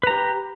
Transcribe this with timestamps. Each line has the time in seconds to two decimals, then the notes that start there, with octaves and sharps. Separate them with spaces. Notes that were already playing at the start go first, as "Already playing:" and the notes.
0.03 B4
0.07 A#5
0.11 G4